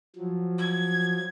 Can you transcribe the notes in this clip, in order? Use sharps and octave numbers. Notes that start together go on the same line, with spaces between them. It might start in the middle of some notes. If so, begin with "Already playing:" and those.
F3 F#3
G#6